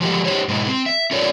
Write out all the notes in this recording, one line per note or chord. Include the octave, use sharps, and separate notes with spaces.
F3 F#3 G#3 F#4 G4 A4
D#4 F4 G4 C5 C#5
G#2 B2 G#3 D#4 E4
C4
E5
C#4 F4 A4 C#5 D5